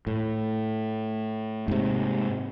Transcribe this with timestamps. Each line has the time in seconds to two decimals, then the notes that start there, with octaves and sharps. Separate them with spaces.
0.07 A2
1.68 G#2 C3